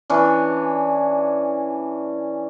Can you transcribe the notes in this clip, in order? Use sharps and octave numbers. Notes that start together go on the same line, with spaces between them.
E3 C#4 D4